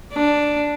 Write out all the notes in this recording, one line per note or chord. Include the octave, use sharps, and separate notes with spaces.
D4